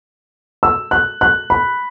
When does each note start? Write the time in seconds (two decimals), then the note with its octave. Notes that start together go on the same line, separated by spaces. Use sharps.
0.63 E6
0.91 F#6
1.21 F#6
1.50 B5